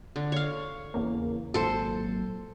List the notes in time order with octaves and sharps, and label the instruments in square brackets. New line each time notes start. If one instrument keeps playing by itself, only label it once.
[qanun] D3
C#5 F5
[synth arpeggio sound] E2 C#3 A#3
[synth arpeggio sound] G#1 A#2 F#3 [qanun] A4 C5